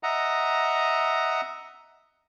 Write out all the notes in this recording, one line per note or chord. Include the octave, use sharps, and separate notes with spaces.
D#5 E5 F#5 A#5